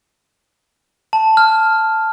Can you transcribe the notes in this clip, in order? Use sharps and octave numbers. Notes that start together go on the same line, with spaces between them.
A5
F6